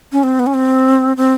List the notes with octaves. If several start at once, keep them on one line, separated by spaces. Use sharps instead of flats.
C#4
C4
B3
C#4
C4
C4